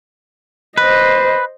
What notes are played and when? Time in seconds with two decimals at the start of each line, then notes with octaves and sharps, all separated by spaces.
0.78 B4 C5 D#5